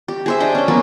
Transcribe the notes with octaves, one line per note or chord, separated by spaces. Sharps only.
G4
G#4 C5 E5
D4 D#5 G5
C#4 G5
F#3 A#3 B3 F#4